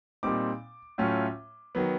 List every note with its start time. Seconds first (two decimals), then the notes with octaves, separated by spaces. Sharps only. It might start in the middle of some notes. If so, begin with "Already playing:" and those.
0.23 A#2 G3 C4 D#4 D6
0.98 A2 F#3 A3 C#4 F4
1.75 D#3 F#3 B3